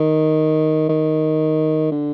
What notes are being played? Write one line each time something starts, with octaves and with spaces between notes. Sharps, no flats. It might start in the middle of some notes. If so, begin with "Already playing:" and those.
Already playing: D#3
D#3
D3